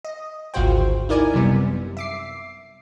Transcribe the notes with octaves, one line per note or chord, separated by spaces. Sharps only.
D#5
G#1 D2 F4 F#4 C5 G5
D#4 E4 A#4 D5 G#5
F#2 C3 G3 B3
E5 D6 C7